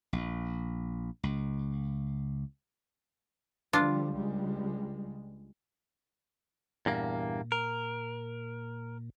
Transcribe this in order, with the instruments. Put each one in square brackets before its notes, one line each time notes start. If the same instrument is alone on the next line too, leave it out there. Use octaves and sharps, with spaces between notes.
[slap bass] A#1
C#2
[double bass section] D3 F3 G3 [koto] D4 F4
[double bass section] C#2 G3 G#3
[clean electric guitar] E2 G2 A#3 [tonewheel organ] A#2
[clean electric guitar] A#4